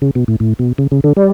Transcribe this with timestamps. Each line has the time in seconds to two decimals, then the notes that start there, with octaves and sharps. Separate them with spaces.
0.02 C#3
0.15 B2
0.28 A2
0.40 A2
0.59 B2
0.78 C#3
0.92 C#3
1.04 D3
1.17 G3